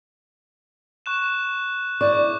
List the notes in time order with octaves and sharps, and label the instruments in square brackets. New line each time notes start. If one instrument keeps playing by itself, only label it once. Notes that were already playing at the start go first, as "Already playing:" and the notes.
[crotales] C#6 F#6 E7
[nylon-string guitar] E4 D5 [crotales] C#6 G6